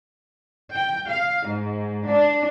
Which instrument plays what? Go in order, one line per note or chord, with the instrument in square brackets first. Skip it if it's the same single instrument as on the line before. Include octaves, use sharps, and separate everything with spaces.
[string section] G5
F5
G#2
D4